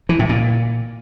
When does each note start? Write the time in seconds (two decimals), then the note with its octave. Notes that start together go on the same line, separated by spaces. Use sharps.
0.09 E3
0.19 A2
0.29 A#2